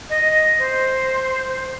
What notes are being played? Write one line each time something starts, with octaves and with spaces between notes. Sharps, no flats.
D#5
C5